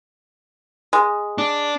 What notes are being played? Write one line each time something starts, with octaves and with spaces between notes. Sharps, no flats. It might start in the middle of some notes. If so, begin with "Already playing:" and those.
G#3
D4